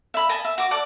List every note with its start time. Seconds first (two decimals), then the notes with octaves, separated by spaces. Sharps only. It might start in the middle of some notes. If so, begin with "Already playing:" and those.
0.14 E5 B5
0.29 D#5 G#5 A5 B5
0.45 E5
0.58 F#4 D6
0.71 A4 D5 F#5 D6